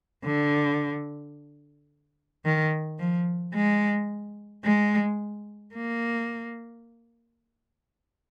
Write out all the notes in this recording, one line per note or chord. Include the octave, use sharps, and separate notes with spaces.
D3
D#3
F3
G#3
G#3
A#3